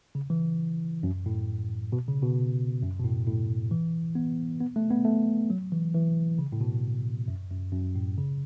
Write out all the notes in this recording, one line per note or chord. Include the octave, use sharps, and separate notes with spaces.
C#3
E3
F#2
A2
B2
C#3
B2
F#2
B2
A2
A2
E3
B3
B3
A3
B3
A3
F#3
E3
E3
C#3
A2
B2
F#2
F#2
F#2
A2
C#3